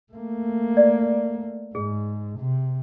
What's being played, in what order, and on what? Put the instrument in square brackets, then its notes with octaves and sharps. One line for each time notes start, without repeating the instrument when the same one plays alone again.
[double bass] A3 A#3
[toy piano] D5
[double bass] G#2 [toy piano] G#4
[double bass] C3